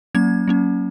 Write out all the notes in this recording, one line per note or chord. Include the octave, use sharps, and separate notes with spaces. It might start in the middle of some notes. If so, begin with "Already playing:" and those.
F#3 A#3 C#4 G#6
F#3 A#3 C#4